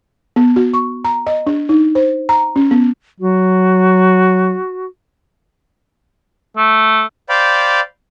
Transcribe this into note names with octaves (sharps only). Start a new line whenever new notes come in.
B3
F#4
C#6
A#5
D#5
D4
D#4
C5
A#5
C#4
B3
F#3 F#4
A3
C5 D5 F5 G5 B5